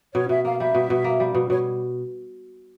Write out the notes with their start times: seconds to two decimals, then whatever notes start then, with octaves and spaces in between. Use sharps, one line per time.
0.14 B2 C#5
0.29 B2 E5
0.44 A#3 F5
0.59 G3 E5
0.75 B2
0.90 B2
1.04 A#3
1.20 G3
1.35 B2
1.50 B2 C#5